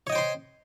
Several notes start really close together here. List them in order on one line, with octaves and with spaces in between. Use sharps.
C#5 D#5 G5 C5 C6